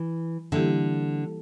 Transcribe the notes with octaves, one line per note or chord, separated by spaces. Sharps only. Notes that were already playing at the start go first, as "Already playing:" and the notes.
Already playing: E3
D3 E3 G3 A#3 E4 G4